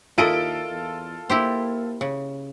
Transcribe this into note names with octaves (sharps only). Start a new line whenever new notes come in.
D#2 E4 F4 A4 A#4 D#5 D7
E2
A#3 E4 G4 C5
C#3